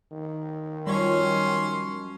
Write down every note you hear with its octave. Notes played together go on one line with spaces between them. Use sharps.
D#3
F#2 F3 G3 C#4 C#5 C6